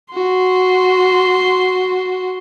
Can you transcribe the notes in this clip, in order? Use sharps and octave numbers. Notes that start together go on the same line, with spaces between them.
F#4 C6